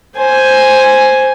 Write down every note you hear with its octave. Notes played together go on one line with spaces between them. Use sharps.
C5 G#5